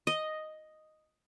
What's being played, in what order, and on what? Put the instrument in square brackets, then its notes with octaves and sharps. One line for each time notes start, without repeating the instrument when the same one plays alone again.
[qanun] D#5